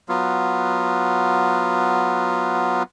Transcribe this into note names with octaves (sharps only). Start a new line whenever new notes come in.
F#3 B3 F4